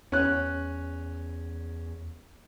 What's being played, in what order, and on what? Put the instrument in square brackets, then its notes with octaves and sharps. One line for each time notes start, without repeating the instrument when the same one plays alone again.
[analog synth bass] E2 [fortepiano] C#4 F#6